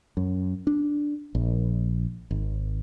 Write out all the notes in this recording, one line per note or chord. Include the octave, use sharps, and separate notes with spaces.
F#2
D4
A#1
G#1